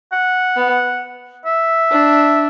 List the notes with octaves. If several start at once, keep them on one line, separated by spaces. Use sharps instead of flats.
F#5
B3
E5
D4